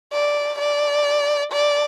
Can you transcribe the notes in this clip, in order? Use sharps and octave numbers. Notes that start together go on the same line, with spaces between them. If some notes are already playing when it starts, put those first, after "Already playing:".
D5
D5
D5